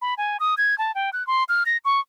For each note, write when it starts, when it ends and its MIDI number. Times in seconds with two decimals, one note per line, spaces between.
0.02 0.14 83
0.18 0.37 80
0.40 0.55 87
0.58 0.77 92
0.78 0.92 81
0.95 1.10 79
1.13 1.25 90
1.27 1.44 84
1.49 1.63 89
1.66 1.77 94
1.85 2.00 85